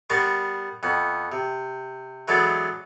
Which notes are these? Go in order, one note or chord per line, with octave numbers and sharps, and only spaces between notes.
G3 B3 A#4 A5 C6 C#6
F2 B3
C3
E3 F#3 G#3 B3 D4 A4